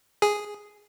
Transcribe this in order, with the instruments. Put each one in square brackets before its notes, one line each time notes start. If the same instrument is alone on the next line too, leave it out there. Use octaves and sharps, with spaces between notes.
[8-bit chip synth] G#4